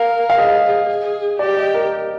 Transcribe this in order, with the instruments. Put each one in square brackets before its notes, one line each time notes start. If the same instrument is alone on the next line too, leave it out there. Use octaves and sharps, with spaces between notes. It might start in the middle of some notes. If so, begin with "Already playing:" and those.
Already playing: [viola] A#4 [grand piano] F5
[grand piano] F5
[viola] G#4 [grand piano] D#5
[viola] G#4
[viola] G4 [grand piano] D5
[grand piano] D#5
A#4